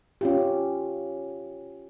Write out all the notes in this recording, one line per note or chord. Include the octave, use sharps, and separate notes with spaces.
C#4 F4 G4